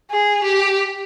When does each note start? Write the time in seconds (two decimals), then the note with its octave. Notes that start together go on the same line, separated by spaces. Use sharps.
0.11 G#4
0.44 G4